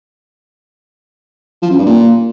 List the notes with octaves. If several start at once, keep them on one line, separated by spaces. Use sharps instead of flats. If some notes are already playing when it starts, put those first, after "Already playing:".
F3
F#2
G2
A#2